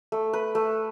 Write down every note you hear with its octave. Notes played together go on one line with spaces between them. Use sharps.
A3
B4
A3